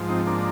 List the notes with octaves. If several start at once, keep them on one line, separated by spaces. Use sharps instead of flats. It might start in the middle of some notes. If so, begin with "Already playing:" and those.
Already playing: G#2 F3
C4 D#4
A#3 D4